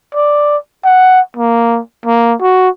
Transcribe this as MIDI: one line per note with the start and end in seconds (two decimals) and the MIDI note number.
0.15 0.57 74
0.85 1.20 78
1.37 1.80 58
2.06 2.34 58
2.41 2.69 66